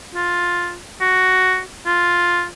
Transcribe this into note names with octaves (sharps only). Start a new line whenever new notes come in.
F4
F#4
F4